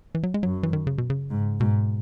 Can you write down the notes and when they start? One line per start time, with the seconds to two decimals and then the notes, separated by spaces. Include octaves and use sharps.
0.15 E3
0.23 F#3
0.34 G#3
0.43 F#2 F#3
0.63 E3
0.73 D#3
0.87 C#3
0.98 B2
1.10 C#3
1.30 G#2
1.60 G#2 B2